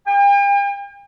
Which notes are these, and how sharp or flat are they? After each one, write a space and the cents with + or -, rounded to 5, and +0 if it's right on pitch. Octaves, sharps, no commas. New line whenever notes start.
G5 +45